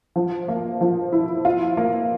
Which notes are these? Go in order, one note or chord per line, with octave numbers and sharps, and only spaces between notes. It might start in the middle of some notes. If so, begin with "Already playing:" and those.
F3
A#3
F3
E4
F4
A#3